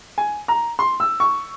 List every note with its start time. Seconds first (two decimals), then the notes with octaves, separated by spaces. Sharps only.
0.18 G#5
0.48 A#5
0.79 C6
1.00 E6
1.20 C#6